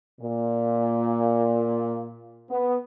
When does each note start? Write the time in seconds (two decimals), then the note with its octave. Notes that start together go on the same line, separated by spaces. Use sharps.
0.21 A#2
2.50 B3